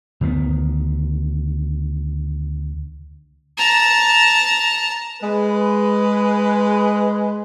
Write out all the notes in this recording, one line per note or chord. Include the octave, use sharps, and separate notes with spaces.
D2 D#3 E3 B3
A5 A#5
G#3 B4